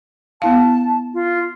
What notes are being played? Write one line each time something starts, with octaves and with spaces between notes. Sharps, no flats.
B3 E4 F5 A5
F4